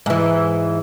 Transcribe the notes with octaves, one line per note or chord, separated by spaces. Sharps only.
G#2 E3